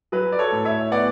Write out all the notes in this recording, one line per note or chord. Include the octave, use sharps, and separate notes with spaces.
F#3 B4
D5
A4 C#5
A2
C#5 E5
B3 D5 F#5